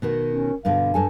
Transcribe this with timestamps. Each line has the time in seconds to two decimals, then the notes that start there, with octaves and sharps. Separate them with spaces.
0.02 B2 D#3 B3
0.31 C#4
0.65 G2 B2 D3 F5
0.94 G2 A4 G#5